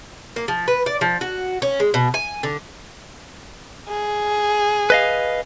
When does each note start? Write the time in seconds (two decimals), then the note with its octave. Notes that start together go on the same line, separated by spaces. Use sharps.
0.36 A#3
0.48 F3
0.68 B4
0.86 D5
1.01 F3
1.21 F#4
1.62 C#4
1.80 G#3
1.94 B2
2.14 G#5
2.43 D3
3.88 G#4
4.90 B4 D#5 F5